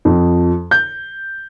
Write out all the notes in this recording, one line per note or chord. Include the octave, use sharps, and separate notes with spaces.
F2
G6